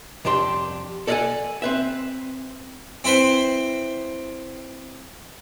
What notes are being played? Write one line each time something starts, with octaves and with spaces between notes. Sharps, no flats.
C2 F2 D4 G4 C6
A4 D5 D#5 F5 F#5 G#5
C4 B4 E5
C4 E4 B4 C5